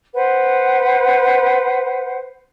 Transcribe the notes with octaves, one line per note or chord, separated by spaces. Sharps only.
B4 C5 F#5